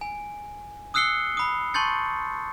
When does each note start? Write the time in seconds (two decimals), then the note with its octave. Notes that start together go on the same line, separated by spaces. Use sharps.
0.01 G#5
0.94 D#6 E6 F#6 C7 C#7 G7
1.37 B5 D#6
1.74 A5 C6 C#6 G6 A6 C#7